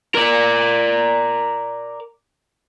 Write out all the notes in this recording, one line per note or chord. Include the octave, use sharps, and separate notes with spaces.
A#4 D5